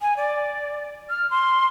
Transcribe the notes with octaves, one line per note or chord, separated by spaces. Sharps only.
G#5
D5
F6
C6